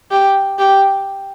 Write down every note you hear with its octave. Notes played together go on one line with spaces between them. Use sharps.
G4
G4